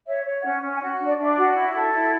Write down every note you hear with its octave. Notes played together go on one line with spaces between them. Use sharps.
C#5 E5
C#5
C#4 F#5
C#4
G#5
F#4 F#5
D4
D5
D4 E5
D5
F#4
E4 E5
A4 F#5
E4